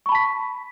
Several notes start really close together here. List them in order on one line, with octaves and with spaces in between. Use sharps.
C#6 B5 A5 B6